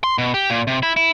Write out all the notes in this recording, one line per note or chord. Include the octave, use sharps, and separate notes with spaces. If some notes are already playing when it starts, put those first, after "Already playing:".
C6
B2
G4
A#2
C3
E4
E4